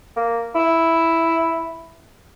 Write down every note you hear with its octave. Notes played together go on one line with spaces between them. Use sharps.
A#3
E4